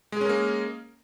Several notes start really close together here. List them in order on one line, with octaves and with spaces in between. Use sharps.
G#3 G#4 C#4 A#4 A#3